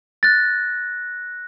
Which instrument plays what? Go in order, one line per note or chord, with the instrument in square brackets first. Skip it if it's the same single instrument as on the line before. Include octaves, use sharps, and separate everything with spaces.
[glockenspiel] F#6 A#6 [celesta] A6